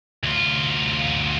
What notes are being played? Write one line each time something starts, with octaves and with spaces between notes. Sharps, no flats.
D2 F4